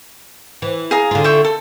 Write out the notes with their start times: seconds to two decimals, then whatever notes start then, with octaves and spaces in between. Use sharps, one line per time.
0.62 E3
0.91 G#4 F5 A#5
1.11 D3 F4
1.24 E5 G5 C#6
1.45 A4